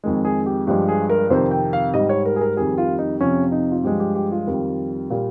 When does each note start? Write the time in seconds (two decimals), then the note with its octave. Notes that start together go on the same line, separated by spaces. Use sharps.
0.04 F2 D#3 G#3
0.25 G#4
0.46 G4
0.67 G2 F3 G#3 G4
0.88 G#4
1.10 A#4
1.30 F2 C3 D#3 C5
1.51 G5
1.73 F5
1.94 G#2 G3 D#5
2.09 C#5
2.26 A#4
2.36 G#4
2.41 A#4
2.56 F2 D#3 G3 G#4
2.78 F4
2.99 D#4
3.20 F2 C3 F3 C#4
3.52 D#4
3.71 F4
3.84 G2 F3 G#3 G4
4.00 G4
4.15 G4
4.32 F4
4.47 F2 D#3 G3
5.10 A#2 G3